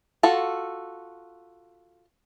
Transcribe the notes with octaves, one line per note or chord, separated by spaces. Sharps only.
F4 F#4 A4